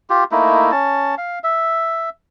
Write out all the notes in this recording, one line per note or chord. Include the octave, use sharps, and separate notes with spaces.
F4 G4
A3 A#3 D#4 E4
C#4 A5
F5
E5